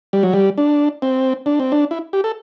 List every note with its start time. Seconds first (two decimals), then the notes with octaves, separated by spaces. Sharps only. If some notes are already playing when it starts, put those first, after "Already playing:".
0.13 G3
0.23 F#3
0.33 G3
0.58 D4
1.02 C4
1.46 D4
1.60 C4
1.72 D4
1.91 E4
2.13 G4
2.24 A4